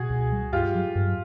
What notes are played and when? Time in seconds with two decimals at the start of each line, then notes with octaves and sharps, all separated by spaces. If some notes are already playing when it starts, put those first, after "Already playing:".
Already playing: B2 F#4 G#4
0.10 C#2
0.32 G3
0.52 G2 F4 G4
0.75 F#3
0.95 G2